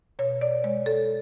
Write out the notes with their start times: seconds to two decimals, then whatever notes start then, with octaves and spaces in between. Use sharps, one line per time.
0.19 B2 C#5
0.41 D5
0.64 G#3 C#5
0.86 A4